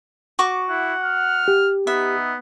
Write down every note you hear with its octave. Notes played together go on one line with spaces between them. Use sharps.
F#4 C#6 D6
E4 F#5
F6
G4
B3 D#4 E5